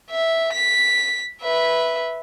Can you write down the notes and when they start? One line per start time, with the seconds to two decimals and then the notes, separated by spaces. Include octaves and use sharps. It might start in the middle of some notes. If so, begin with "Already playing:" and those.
0.11 E5
0.53 B6
1.41 B4 E5